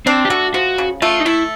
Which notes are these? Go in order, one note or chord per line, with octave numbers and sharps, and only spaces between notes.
C4 D4
G4
A3 F#4
F3 F#4
C#3
A3 F4
D#4
A3 E4